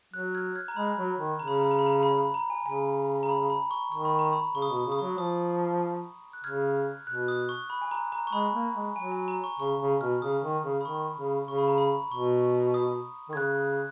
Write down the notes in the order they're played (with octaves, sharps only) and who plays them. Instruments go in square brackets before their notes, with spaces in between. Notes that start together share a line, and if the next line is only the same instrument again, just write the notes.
[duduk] F#3 [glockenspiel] F#6
[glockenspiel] F6 G#6
F6 G#6
A#5
[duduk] G#3 [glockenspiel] B5
[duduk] F#3
D#3
[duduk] C#3 [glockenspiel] A#5
[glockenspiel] B5
A#5
B5
A#5
B5
A#5
B5
B5
A#5
G#5
[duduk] C#3 [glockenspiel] G#5
[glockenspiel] A#5
B5
B5
C#6
[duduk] D#3 [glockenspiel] C#6
[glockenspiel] B5
A#5
B5
[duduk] C#3 [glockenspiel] C#6
[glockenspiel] D#6
[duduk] B2 [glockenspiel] C#6
[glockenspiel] D#6
[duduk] C#3 [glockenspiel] C#6
[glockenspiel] D#6
[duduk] F#3 [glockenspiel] C#6
[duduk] F3 [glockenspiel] D#6
[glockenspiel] F#6
[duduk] C#3 [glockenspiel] F6 G#6
[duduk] B2 [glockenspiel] F#6
[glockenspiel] D#6
C#6
B5
G#5
A#5
A#5
C#6
[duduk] G#3 [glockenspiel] B5
[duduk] A#3
G#3
[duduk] F#3 [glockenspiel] G#5
[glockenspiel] G#5
A#5
C#6
[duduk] C#3 [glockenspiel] C#6
[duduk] C#3
[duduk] B2 [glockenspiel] F6
[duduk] C#3 [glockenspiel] D#6
[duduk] D#3
C#3
[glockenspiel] B5
[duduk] D#3 [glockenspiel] C#6
[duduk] C#3
[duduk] C#3 [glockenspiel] C#6
[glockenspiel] B5
A#5
B5
[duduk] B2 [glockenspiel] C#6
[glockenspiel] D#6
[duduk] D#3
[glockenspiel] G#6
[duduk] C#3 [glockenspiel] F#6